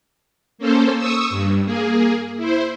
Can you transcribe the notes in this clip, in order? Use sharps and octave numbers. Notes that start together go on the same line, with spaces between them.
A#3 C#4 A4 C5
C#6 D#6 E6
G2
A#3 G#4
E4 C5